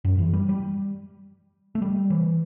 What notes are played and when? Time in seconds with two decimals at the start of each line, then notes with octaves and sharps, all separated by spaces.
0.05 F#2
0.18 E3
0.33 G3
0.49 G3
1.75 A3
1.82 G3
2.10 E3